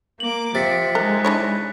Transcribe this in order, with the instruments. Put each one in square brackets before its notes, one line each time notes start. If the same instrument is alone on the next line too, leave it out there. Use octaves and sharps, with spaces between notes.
[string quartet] A#3 D6 [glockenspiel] F#7
[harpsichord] C3 [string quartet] F3 [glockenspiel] A6 B6 C#7
[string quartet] G#3 D#4 [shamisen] A#4 [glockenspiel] F#6
[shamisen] D4 E4 C#5